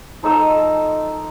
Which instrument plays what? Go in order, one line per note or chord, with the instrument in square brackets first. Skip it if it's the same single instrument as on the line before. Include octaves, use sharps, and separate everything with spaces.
[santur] F3 D#4 A4 E6